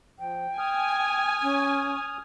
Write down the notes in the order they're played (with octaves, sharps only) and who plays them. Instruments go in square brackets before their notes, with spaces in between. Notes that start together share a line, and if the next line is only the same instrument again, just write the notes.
[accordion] F3 [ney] G5
[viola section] G#5 [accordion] D#6 F6
[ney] C#4